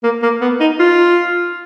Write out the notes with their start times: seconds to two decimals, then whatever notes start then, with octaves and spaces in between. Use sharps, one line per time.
0.03 A#3
0.22 A#3
0.41 B3
0.60 D#4
0.79 F4